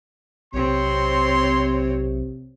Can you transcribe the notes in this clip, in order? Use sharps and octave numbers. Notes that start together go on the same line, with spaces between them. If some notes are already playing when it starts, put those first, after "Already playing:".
B1 C3 C4 C#5 C6